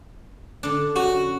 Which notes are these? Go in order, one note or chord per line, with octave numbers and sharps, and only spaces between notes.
D3 D4
C#4 F#4